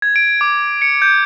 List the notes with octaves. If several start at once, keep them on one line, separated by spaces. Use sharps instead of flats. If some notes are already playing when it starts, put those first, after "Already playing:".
G#6
D7
D6
C#7
G6